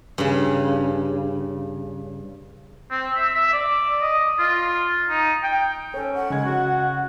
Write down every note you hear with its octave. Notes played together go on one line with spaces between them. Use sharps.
G2 C#3
C4
E5
E5
D5
D#5
F4
D#4
G5
C#4 A4 C#5
F#5 C#6
C#3 G#3 G#6
F#4